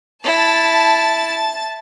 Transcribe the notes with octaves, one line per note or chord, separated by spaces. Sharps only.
E4 A5 A6